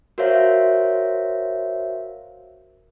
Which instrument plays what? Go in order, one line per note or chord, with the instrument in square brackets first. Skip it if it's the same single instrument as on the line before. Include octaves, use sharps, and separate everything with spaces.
[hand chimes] F#4 A#4 C5 C#5 E5 F5